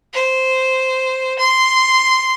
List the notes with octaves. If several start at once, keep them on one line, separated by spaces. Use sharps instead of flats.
C5
C6